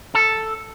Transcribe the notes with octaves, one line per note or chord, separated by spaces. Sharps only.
A4